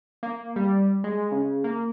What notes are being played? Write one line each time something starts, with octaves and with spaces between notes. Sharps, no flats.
A#3
G3
G#3
C#3
A#3